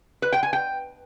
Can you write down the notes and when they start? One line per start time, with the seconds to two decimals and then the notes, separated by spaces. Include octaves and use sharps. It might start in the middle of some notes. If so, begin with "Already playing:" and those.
0.22 B4
0.33 G5
0.43 G#5
0.53 G5